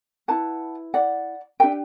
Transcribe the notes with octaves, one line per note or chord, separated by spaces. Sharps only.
E4 B4 F#5 A5
D5 F#5
D4 G4 B4 E5 G5